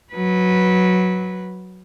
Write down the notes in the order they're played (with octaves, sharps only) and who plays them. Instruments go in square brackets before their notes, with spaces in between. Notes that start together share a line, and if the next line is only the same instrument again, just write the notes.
[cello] F#3 B4